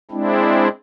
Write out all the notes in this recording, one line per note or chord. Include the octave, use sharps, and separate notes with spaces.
G#3 C4 D4 E4